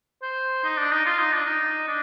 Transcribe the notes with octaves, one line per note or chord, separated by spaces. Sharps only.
C5
D#4
D4
D#4
F4
D#4
D4
D#4
D4